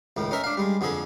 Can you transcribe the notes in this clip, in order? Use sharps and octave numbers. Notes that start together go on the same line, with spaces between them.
C#2 A2 D#3
C#4 D#4 A#4 E5
D4 F5
G3 G#3
F2 D3 F3 G#4 A4